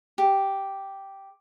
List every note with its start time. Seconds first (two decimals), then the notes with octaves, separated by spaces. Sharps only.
0.18 G4